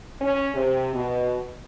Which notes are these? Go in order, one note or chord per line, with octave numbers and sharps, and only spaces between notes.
C#4
C3
B2